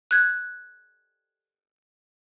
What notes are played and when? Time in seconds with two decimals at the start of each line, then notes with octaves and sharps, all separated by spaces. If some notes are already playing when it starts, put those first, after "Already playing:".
0.11 F#6 G#6